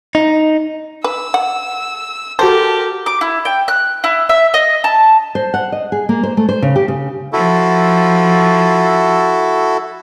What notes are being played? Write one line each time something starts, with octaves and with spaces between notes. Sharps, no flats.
D#4
B4 E6
F#5
F#4 G4 A4 A#4 C5 A5
D6
E4
G5
F#6
E4
E5
D#5
A5
C5
F#5
D#5
G#4
A#3
C5
A3
C5
C#3
G4
C#3
F3 E4 F#4 A4